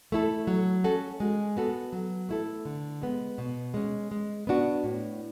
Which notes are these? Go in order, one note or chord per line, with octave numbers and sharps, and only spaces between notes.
A3 E4 A4
F#3
C#4 F#4 A4
G#3
B3 F#4 A4
F#3
A3 E4 A4
D3
G#3 B3
B2
G#3 C#4
G#3
B3 D4 F#4
A2